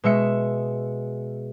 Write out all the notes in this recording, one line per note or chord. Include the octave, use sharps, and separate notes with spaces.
B2 G#3 E5 C#7